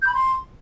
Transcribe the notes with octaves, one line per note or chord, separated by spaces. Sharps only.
G6
B5
C6